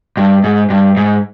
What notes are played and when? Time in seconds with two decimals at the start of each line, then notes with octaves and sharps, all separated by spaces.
0.17 G2
0.44 G#2
0.70 G2
0.97 G#2